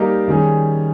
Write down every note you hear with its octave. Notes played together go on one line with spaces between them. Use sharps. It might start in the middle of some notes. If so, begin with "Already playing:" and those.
Already playing: G3 A#3 D#4 G4
D#3 G3 C#4 G#4